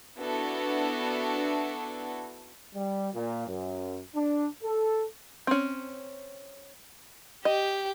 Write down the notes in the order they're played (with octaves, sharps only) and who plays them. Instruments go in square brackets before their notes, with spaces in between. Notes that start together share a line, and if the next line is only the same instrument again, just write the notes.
[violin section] B3 D4 E4 F#4 A4
[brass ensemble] G3
A#2
F#2
D4
A4
[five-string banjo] C4 C#4
[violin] G4 [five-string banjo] D#5